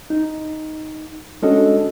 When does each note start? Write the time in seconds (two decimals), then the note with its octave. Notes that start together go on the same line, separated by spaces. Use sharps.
0.10 D#4
1.42 G#3 C#4 D4 F#4 A4 D#5